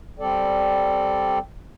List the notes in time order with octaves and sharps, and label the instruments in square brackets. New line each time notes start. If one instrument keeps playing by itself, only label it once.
[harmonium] G3 C4 A4 D5